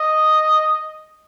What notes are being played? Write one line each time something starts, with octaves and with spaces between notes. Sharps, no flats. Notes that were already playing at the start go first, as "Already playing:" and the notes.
Already playing: D#5